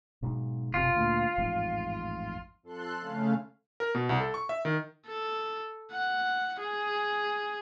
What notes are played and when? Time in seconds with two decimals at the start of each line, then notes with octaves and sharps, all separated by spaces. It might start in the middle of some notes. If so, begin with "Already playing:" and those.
0.22 B1 G#2
0.74 F#1 B1 C3 F4
0.95 D2 A#2
1.38 A1 F2 G#2
2.63 F2 A4 C6 F#6
3.00 C#3 A3 C#4 F5
3.80 A#4
3.95 B2
4.09 C2
4.21 A4
4.34 C#6
4.49 E5
4.65 D#3
5.06 A4
5.92 F#5
6.60 G#4